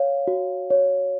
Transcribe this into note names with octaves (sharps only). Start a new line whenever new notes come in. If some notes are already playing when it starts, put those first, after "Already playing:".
Already playing: C#5 F5
F#4
C#5